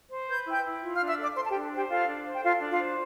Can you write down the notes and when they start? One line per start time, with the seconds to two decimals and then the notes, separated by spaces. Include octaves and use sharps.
0.11 C5
0.29 B4 G6
0.47 E4 G5 G6
0.64 E4
0.82 F4
0.95 F5 F6
1.00 D4
1.08 E5 E6
1.18 A4 D5 D6
1.36 A4 C5 C6
1.45 A5
1.50 G4 G5
1.54 D4
1.72 G4 C5 G5
1.89 F4 A4 F5
2.07 D4
2.25 C5
2.34 G5
2.43 F4 A4 F5
2.61 D4
2.69 F4 F5
2.79 C5